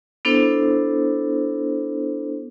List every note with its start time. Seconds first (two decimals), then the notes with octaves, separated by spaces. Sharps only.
0.25 B3 D4 E4 A4 C5